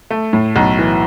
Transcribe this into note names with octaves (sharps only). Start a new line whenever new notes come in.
A3
A2
B1
E3